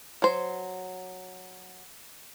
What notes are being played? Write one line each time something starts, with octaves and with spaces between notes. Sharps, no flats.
F#3 C5